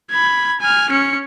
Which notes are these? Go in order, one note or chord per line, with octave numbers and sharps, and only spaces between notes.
B5 G#6
G#5 F6
C#4 C#7